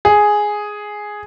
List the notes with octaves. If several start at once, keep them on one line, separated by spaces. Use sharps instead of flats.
G#4